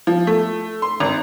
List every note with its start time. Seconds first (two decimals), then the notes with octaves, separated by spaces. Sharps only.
0.07 F3
0.27 A3
0.82 C6
1.00 G#1